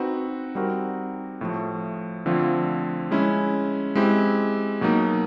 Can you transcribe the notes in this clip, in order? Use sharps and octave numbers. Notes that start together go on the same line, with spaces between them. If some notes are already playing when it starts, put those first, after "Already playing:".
Already playing: C4 D#4 F#4 B4
G3 C4 D#4 F#4 A#4
A2 F3 A3
D3 F3 A3 C4 F4
G#3 C#4 E4
G#3 C4 E4 G4
B2 F#3 A#3 D#4